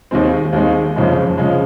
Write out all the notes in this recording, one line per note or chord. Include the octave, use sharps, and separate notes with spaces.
D#2 D#3 G#3 C4
D#2 D#3 G#3 C4
F#1 F2 C#3 F3 G#3
C#3 F3 G#3